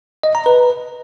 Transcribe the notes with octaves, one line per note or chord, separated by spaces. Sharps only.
D#5
A#5
B4